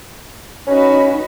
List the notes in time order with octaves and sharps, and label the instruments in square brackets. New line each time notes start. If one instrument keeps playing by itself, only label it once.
[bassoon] C#4 [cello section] D#4 F#4 B4